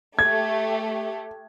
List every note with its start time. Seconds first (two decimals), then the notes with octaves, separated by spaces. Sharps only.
0.19 A3 G4 G#6